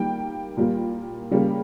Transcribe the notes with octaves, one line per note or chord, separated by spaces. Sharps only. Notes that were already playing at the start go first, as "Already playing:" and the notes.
Already playing: D#3 G3 A#3 G5
A#2 G3 A#3
C#3 G3 A#3